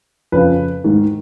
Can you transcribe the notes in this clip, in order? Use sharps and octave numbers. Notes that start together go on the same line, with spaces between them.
F2 C#3 B4
G#2 D#3